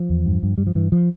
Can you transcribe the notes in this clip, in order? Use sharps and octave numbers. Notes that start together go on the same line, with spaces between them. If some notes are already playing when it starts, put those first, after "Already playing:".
Already playing: F3
E2
G2
G2
G2 G3
F3
G2 E3
F3